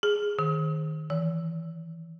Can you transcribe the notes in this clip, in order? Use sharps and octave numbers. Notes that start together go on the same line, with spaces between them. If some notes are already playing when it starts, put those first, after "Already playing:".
G#4
D#3
E3